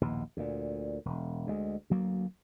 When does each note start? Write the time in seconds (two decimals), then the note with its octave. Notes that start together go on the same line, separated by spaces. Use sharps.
0.01 A#1 D#2 B2
0.37 D2 A#2
1.05 E1
1.47 D2 G#3
1.90 D2 F#3 A#3